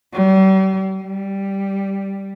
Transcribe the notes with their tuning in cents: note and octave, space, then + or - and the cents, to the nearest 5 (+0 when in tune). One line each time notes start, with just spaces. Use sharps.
G3 -40
G3 +0